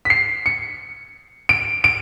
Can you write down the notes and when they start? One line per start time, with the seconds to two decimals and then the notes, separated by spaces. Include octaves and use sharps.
0.05 B6
0.10 C7
0.46 C#7
1.49 D7
1.84 D7